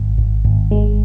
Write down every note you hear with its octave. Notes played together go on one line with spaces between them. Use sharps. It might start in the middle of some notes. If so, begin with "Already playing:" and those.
Already playing: G#1
G#1
G#1
G#3